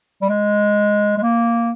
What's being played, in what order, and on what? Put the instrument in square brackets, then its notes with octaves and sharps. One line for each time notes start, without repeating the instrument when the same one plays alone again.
[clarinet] G3
G#3
G#3
A#3